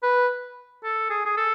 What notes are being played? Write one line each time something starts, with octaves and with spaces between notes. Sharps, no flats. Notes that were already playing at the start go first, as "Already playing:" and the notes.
B4
A4
G#4
G#4
A4